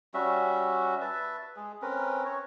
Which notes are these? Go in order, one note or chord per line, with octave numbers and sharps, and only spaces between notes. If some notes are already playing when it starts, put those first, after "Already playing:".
G3 C#4 F#4 E5
B4 E5 A5
G#3 G#4
C4 C#4 A#4 B4
C#5